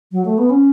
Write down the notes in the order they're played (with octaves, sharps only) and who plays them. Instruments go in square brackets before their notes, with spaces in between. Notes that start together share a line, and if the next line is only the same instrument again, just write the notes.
[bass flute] F#3
A3
B3
C#4